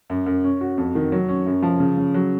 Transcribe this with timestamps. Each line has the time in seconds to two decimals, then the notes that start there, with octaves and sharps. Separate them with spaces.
0.10 F#2
0.26 F#2
0.44 C#4
0.61 F#4
0.77 F2
0.95 D#3
1.12 F#3
1.29 C#4
1.46 F#2
1.62 F3
1.80 C#3
1.97 C#3
2.14 F#3